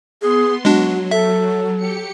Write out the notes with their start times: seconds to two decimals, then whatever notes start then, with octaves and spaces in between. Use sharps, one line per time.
0.22 B3 G#4 C6
0.65 F#3 G#3 D4 F#4
1.11 A4 E5
1.77 G4 C#7